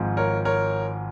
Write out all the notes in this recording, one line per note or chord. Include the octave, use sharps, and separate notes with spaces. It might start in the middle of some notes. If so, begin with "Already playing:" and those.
Already playing: G#1 G#2 F3
A#4 C#5
A#4 C#5